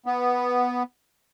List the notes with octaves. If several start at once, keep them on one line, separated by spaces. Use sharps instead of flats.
B3